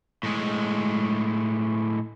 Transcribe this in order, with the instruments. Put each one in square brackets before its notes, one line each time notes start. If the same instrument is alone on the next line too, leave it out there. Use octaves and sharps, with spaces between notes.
[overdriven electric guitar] A2 G#3